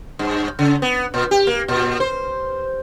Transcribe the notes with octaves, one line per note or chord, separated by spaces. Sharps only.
G2
C#3
B3
A#2
G4
A#3
A#2
C5